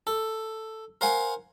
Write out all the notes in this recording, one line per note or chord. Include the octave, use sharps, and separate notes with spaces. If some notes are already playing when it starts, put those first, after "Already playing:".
A4
A#4 C5 F5 F#5 G#5